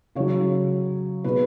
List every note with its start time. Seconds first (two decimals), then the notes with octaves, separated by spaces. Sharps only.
0.15 C#3 F#3 C#5
1.24 B2 G#3 B4